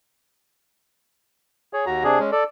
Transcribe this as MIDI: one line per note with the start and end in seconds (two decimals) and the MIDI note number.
1.73 1.85 68
1.73 1.85 73
1.86 2.04 39
1.86 2.04 66
1.86 2.04 82
2.04 2.19 48
2.04 2.19 62
2.04 2.19 68
2.20 2.30 56
2.20 2.30 61
2.32 2.44 69
2.32 2.44 74